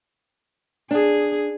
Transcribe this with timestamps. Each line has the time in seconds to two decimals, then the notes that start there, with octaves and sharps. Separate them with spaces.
0.91 D4 G#4